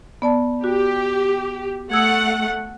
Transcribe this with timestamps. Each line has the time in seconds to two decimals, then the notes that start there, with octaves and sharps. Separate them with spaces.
0.22 B3 D5 A5
0.64 F#4 G4
1.91 A3 F#5 D#6 E6 G#6